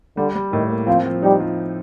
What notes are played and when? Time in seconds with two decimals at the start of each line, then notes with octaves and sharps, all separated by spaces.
0.17 D3 G3
0.35 G3
0.52 A2 D#3
0.70 A#3
0.87 F3 C4
1.06 F3
1.22 G3 D#4
1.40 F3